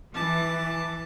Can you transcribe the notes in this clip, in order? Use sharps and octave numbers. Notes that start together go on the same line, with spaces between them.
E3 A5 D6